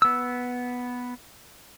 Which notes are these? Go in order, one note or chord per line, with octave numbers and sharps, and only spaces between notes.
B3 E6